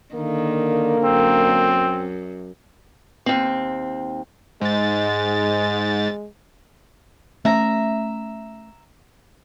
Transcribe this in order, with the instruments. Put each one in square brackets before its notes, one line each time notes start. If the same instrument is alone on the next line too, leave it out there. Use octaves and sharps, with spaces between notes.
[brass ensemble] D3 A#3 [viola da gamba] D#3
[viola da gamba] F#2 [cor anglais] C4
[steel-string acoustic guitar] D#2 C4
[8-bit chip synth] G#2 A6 [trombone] G#3
[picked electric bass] A3 C#4 [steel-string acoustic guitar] E5 A#5